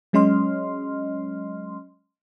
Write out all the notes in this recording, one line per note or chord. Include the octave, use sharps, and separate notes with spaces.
F#3 G#3 C#4 D#5 C6 F6